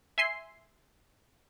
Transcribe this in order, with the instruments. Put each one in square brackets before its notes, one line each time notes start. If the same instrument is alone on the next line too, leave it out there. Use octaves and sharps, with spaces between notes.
[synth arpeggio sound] E5 G#5 C6 C7